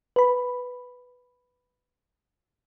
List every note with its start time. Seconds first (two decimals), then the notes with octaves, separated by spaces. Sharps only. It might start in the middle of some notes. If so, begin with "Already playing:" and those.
0.16 B4 B5